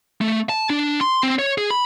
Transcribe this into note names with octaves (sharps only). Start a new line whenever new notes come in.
A3
A5
D4
C6
C4
C#5
G#4
B5